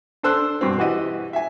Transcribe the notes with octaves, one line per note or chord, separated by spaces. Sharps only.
D4 A4 C5 E6 F#6
G2 B2 C4
E3 F#4 G4 D#5
E5 G#5